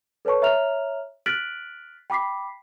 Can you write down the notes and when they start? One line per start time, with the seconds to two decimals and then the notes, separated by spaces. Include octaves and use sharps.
0.25 A4 B4 C#5 A5 C#6
0.42 C#5 E5 A#5 F6 F7
1.26 F6 F#6 A6 B6 D7 F#7
2.10 G5 B5 D6 B6 C7